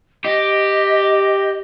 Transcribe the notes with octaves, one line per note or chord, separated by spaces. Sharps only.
G4 D#5